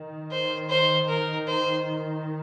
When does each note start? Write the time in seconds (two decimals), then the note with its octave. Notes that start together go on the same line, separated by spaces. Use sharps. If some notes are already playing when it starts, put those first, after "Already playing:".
Already playing: D#3
0.31 C5
0.69 C5
1.08 A#4
1.47 C5